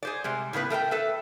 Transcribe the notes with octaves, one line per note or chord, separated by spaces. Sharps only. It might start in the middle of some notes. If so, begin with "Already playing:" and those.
G#4 C5 D5
C3 G3 G#3
A2 C#3 B3 B4
A3 A#4 F5 G5
A4 B4 E5